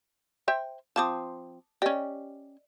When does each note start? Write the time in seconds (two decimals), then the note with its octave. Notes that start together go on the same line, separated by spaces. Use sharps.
0.48 C5 E5 G5
0.96 F3 C4 A5 D6 D#6
1.82 C#4 G4 D5 D#5